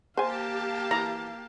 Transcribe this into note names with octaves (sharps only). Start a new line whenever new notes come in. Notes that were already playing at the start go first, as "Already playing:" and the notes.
A#3 G4 C5 F5 G#5 A5
E3 A#5